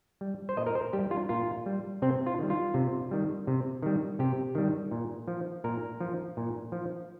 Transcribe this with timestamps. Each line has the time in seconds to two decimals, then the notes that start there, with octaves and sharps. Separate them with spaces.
0.21 G3
0.49 C5
0.57 A#2 D#5
0.66 A#4
0.75 C5
0.93 G3 G4
1.11 F4
1.29 A#2 F4
1.66 G3
2.02 C3 C4
2.26 F4
2.39 D#3 G3
2.50 F4
2.74 C3
3.11 D#3 G3
3.47 C3
3.83 D#3 G3
4.19 C3 G4
4.55 D#3 G3
4.91 A#2
5.28 F3
5.64 A#2 A#4
6.01 F3
6.37 A#2
6.72 F3